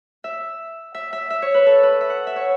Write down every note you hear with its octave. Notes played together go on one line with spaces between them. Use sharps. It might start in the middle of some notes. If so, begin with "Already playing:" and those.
E5
E5
E5
E5
C#5
B4
A4
B4
E5
F#5
E5
C#5